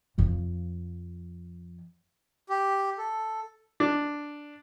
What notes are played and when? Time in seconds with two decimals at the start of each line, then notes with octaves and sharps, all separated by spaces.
0.18 F2 F3
2.49 G4
2.98 A4
3.80 D4